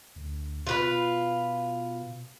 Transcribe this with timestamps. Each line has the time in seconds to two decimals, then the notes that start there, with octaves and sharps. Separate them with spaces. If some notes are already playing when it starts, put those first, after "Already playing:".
0.16 D2
0.67 B2 F4 F#4 B4